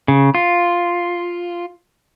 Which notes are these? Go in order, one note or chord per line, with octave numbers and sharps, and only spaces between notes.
C#3
F4